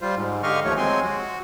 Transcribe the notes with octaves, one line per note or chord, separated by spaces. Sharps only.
G3 F4 C5
G#2
D3 G4 D#5 F5 C#6 F6
D#2 F3 A3 C#5
F#3 G#3 C4 G#5 C6
F#4